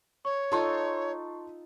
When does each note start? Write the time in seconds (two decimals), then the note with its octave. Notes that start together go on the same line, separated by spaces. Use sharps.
0.25 C#5 C#6
0.52 D#4 F4 A4 A5 C6